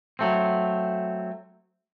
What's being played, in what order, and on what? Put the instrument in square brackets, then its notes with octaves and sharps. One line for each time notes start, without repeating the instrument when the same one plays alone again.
[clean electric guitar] F#3 A3 C4